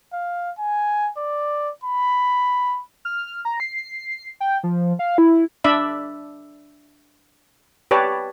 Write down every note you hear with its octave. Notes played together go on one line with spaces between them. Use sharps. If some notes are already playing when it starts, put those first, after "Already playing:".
F5
G#5
D5
B5
F6
A#5
C7
G5
F3
F5
E4
D4 D5 E5 B5
G4 B4 C#5 D5 A5